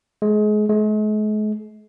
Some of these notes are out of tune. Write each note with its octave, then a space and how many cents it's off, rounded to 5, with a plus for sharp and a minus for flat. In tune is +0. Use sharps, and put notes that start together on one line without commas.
G#3 +30
G#3 +45